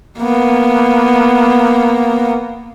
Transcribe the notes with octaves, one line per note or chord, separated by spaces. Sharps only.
A#3 B3